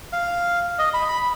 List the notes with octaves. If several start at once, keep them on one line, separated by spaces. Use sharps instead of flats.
F5
D#5
B5
B5